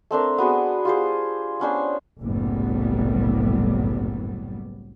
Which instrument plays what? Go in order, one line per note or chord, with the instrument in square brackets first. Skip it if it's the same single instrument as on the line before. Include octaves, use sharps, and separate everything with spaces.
[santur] A3 C4 D4 A#4
B3 F#4 G#4
F4 G4 G#4 C5
B3 C#4 D4 C5
[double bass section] F#1 C2 A2 F#3 G3 B3